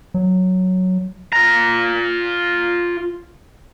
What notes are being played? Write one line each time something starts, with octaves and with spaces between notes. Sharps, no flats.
F#3
F4 A#5